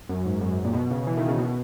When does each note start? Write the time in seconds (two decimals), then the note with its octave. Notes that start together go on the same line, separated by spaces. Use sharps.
0.09 F#2
0.26 G#2
0.41 F#2
0.64 A#2
0.73 B2
0.91 C#3
1.07 E3
1.17 D#3
1.28 C#3
1.39 B2